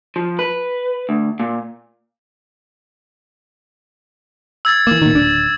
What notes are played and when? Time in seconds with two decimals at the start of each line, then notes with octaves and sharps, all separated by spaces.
0.16 F3
0.39 B4
1.09 D2
1.40 A#2
4.65 E6 G#6 A6
4.87 E3 A#3 D6
5.02 A#2 D#3
5.14 D1 D4